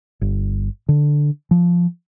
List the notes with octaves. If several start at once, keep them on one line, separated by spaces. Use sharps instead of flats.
G1
D3
F3